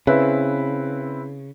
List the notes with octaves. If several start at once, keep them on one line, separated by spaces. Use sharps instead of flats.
C#3 C4 E4 B4